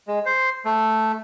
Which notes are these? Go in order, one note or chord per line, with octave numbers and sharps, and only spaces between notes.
G#3
C5
A3